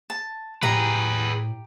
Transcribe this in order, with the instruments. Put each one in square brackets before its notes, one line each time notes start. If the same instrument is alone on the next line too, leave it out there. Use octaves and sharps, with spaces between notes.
[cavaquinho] A5
[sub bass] A2 [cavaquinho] G4 A#5 [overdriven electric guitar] G#4 B4